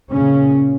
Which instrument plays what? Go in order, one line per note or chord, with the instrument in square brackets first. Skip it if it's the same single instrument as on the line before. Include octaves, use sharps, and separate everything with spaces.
[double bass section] A#2 C#3 C#4